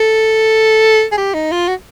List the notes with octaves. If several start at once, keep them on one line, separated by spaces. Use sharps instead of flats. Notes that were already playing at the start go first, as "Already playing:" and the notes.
Already playing: A4
G#4
G4
D#4
F4
F#4